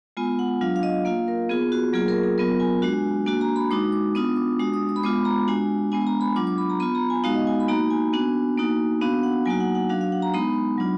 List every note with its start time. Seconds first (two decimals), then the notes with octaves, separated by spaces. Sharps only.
0.17 G#3 B3 F4 G#5
0.39 F#5
0.61 F#3 D4 F4 F5
0.76 F5
0.83 D#5
1.05 A#3 F4 F5
1.28 A#4
1.49 B3 F4 G#4
1.72 F#4
1.93 F#3 A#3 F4 G#4
2.08 A#4
2.23 G#4
2.38 F#3 B3 F4 A#4
2.60 G#5
2.82 G#3 D4 F#4
3.26 A#3 D4 F#4 G#5
3.41 A#5
3.56 B5
3.71 G#3 D#4 F#4 D6
3.92 D6
4.15 B3 D4 F4 D#6
4.36 D6
4.59 G#3 D4 F#4 D#6
4.74 D#6
4.89 D#6
4.96 B5
5.03 G#3 B3 F4 D6
5.25 A#5
5.47 G#3 D4 F#4 G#5
5.92 G#3 B3 D4 G#5
6.07 A#5
6.21 B5
6.36 F#3 D4 F4 D6
6.47 D6
6.58 B5
6.70 A#5
6.80 B3 F4 B5
6.95 A#5
7.10 G#5
7.24 G#3 B3 D#4 F#4 F5
7.35 D#5
7.47 G#5
7.60 B5
7.68 A#3 D#4 F#4 A#5
7.90 G#5
8.13 B3 D4 F#4
8.57 A#3 D#4 F#4
9.01 B3 D4 F#4 F5
9.23 F#5
9.45 F#3 A#3 D#4 F#4 G#5
9.60 F#5
9.75 F#5
9.89 F#3 D4 F#4 F5
10.01 F5
10.12 F#5
10.22 A#5
10.34 G#3 B3 D#4 B5
10.78 F#3 D4 F4